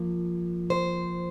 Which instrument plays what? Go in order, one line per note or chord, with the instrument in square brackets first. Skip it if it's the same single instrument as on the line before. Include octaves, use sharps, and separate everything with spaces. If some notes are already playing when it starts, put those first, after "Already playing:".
Already playing: [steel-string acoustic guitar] F3 A#3
C5